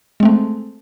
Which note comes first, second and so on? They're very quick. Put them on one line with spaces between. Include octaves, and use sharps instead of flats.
G#3 C4 A3